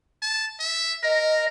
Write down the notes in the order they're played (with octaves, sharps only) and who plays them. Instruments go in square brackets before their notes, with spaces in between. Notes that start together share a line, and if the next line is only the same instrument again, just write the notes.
[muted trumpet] A5
E5
[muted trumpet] A#4 [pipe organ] D#5